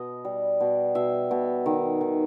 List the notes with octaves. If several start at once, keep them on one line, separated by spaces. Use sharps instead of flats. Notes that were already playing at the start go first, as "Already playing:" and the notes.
Already playing: B2 D#5
G3
B2
B2 E5
B2
D#3
D#3